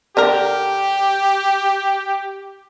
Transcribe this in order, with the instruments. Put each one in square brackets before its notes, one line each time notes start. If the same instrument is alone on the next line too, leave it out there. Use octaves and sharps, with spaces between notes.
[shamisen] D3 D4 A#4 [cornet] G4